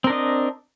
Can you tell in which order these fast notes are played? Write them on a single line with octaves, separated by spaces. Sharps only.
C4 A#4 D4 D#5